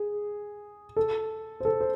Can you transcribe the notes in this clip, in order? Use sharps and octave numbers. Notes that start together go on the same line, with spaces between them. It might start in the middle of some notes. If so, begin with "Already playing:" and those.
Already playing: G#4
A4
C5
A4
C5